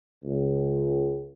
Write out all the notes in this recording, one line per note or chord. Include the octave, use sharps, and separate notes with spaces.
C#2